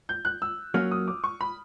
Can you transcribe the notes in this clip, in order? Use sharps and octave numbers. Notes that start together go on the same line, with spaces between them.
G6
F#6
E6
F#3 A#3 C#4 F6
D#6
D6
C#6
B5